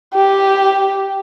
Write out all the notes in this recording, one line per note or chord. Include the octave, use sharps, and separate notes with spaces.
G4